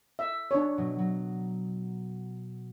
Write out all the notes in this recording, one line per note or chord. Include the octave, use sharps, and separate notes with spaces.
E5
D4 C#5
B2 F#3
F#3